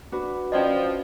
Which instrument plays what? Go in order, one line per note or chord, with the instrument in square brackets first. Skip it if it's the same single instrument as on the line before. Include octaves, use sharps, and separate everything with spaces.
[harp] D4 F#4 B4
[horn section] F3 [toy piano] C#4 D5 D#5